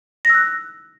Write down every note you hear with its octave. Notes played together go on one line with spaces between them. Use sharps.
E6 F#6 A#6